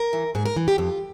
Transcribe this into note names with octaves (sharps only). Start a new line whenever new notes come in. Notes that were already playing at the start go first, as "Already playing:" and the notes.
Already playing: A#4
E3
G#2 G#4
A#4
E3
G4
F2 F4